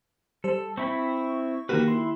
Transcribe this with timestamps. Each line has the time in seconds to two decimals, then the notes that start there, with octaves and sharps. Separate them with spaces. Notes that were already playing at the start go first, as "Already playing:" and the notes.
0.44 G3 A4 C5
0.77 C4 E4 B5 C#6
1.69 D#3 A#3 F#4 G4 A#4 B4
1.88 E4 C6